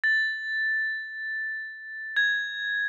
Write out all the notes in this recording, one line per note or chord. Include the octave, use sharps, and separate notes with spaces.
A6
G#6